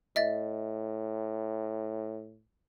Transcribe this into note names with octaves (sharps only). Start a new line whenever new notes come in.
A2 D#5 E5 A6